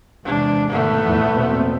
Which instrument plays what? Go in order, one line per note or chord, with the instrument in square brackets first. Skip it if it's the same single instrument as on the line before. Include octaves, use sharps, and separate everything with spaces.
[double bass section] E2 C3 G#3 [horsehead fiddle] D4
[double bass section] G#2 B2 D#3 [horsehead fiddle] A3 B3
[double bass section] E2 A2 F3
B2 A#3 C4